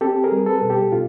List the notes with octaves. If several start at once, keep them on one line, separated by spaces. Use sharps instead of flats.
C4 G4 A4
G#4 A#4
G3
A4 B4
B2
G4 A4
B2 F4